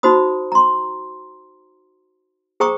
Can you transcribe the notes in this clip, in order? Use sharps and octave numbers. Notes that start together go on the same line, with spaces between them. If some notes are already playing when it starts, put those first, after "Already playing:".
D#4 F#4 C5 B5 D#6
A#5 C6
G#4 C5 G5 A#5 C#6 D#6